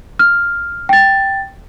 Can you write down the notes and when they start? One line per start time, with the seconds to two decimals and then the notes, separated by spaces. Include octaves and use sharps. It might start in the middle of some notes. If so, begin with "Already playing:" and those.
0.19 F6
0.89 G5 A6